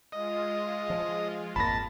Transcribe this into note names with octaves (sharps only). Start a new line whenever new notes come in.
G#3 F4 D#5
F3
G#1 F2 A#3 A5 B5 A#6